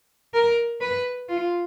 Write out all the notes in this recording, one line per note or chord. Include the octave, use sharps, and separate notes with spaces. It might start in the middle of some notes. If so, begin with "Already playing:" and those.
A#4
B4
F4